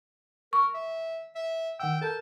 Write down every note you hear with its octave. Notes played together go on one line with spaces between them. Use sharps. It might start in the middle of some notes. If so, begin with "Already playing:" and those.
A#4 C#6
E5
E5
D#3 F#5 G5 E6
A4 A#4 A5 G6